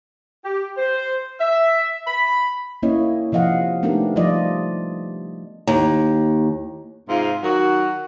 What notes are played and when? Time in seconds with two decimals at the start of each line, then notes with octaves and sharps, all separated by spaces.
0.44 G4
0.78 C5
1.40 E5
2.07 B5
2.83 A#3 C#4 E4 C#5 D#5
3.32 C3 F3 D#5 F5 F#5
3.83 A3 B3 D4 D#4 G4 A#4
4.16 F3 G3 F4 D5 D#5
5.67 D#2
7.08 G#2 C3 C4 F4
7.43 D#3 F#3 F#4